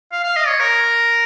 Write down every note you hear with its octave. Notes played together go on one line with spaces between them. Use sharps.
F5
F5
D#5
C#5
A#4